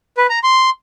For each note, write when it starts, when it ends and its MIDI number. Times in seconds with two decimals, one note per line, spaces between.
0.17 0.27 71
0.30 0.39 82
0.43 0.70 84